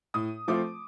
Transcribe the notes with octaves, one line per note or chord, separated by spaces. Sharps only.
A2 D#6
F3 A3 C4 F4 D6